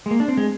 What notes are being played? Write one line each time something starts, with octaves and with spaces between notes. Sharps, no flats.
G#3
A#3
D4
C4
G#3